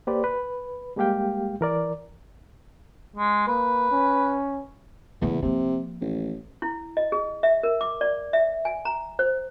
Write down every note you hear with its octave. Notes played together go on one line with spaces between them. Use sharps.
A#3 G4 B4 C5 D5
B4
G3 G#3 A#3 G4 F5 G5
E3 A#4 D5
G#3
A#3 B4
C#4
E2 C#3 A3
C3 F3 A#3
A1
E4
D#5
G#4
E5
A#4
D6
D5
E5
G#5
A#5
C5